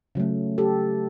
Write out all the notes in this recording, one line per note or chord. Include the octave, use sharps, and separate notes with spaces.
C#3 F#3 A3
G4 A4